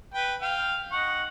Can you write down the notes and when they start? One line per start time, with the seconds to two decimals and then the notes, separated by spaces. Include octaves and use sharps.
0.14 B4 G5
0.42 F5 G5
0.92 D#4 F#5 C#6